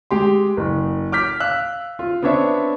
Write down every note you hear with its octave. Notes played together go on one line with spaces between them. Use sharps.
G#3 G4 C6
F#1
D6 F6 G6 B6
F5 E6 F#6
F4
B3 C4 D4 C#5 E5